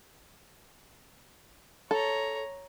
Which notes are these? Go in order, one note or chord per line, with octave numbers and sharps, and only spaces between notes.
A4 C#5 A#5